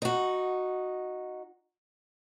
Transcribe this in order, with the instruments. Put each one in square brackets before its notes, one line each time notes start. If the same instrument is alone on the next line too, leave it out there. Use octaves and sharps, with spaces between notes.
[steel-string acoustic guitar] D#4 F#4